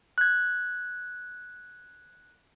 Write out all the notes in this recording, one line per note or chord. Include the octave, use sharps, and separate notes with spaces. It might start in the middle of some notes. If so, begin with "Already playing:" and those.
F#6 G#6